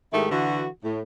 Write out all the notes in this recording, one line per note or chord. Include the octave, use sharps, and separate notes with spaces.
G#2 D#3 G#3 A3 E4 G4
D3 E3 F#4
A2